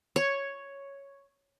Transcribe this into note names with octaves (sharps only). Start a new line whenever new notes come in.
C#5